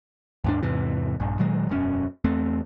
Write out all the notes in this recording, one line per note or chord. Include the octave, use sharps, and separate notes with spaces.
D#2 G#2 D4
E2 G#2 C3 E3
A#1 G2
A#2 D#3 F#3 G#3
E1 F#2 G#3 C#4
E2 A3 C4